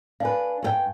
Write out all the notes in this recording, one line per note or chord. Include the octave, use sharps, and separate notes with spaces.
D4 B4 F5 G#5
G2 A4 G5